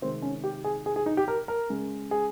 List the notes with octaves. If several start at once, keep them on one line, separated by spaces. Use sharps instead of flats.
C3 D#3 G#3 C4
C#4
G4
G#4
G#4
G#4
D#4
G4
A#4
A#4
C#3 G#3
G#4